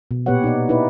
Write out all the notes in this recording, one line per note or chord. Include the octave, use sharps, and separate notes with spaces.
B2
A#2 B3 G4 B4 C#5 F#5
D#4 D5
D#4 E4 B4 D5